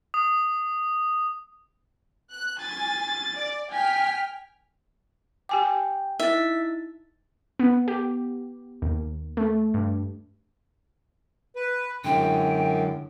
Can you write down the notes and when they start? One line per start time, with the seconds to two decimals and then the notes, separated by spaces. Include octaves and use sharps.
0.14 D#6
2.32 F#6
2.61 G#5 A6
3.36 D5
3.72 G5 G#5 F6 B6
5.49 G4 G5 G#5 D6
6.20 D#4 E4 E5 A6
7.59 B3
7.88 G4
8.82 D#2
9.37 A3
9.74 G2
11.56 B4
12.04 F#2 D3 G#3 E4 G5